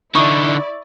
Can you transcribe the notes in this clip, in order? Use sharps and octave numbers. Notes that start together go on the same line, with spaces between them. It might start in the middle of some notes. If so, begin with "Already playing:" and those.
D3 D#4 E4 D5 B5 C#6 D#6